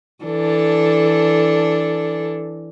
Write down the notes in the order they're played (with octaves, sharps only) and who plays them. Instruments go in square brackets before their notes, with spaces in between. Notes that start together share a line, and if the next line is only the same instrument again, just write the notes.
[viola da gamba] E3 D4 A4